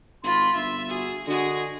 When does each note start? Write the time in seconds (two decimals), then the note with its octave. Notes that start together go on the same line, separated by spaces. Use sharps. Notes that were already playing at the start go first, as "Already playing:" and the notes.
0.24 G#1 F4 B5 C6
0.55 G1 E5
0.88 F#4 G#4
1.27 D3 G#3 F#4 G#4